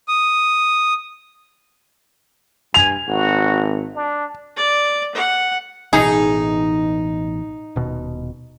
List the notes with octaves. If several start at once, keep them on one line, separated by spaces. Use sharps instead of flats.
D#6
G2 G#5 F7
G#1 F#4
D4
D5
F#5
A1 B2 E3 D#4 G#4
D#1 B2